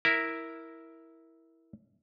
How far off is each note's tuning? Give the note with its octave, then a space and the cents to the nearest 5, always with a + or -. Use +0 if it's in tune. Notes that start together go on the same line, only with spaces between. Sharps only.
E4 -5 A#4 +0